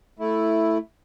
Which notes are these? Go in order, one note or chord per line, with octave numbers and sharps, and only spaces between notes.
A3 E4